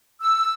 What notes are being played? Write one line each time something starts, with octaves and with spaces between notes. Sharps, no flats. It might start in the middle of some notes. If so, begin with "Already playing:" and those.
E6